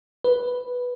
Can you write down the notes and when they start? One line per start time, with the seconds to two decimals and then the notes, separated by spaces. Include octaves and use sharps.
0.24 B4